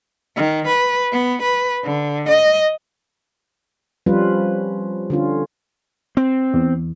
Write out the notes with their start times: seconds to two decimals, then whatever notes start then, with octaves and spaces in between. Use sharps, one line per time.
0.37 D#3
0.67 B4
1.13 B3
1.42 B4
1.84 D3
2.29 D#5
4.06 F3 G3 C4 C#4 F4 B4
5.10 D3 C#4 F4
6.17 C4
6.54 E2